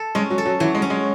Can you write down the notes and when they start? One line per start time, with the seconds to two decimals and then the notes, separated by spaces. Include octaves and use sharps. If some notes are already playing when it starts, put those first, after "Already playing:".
Already playing: A4
0.15 G#3 C#4
0.30 F#3
0.38 A4
0.46 F#3
0.60 E3 F#3
0.75 G#3
0.82 C#4
0.90 G#3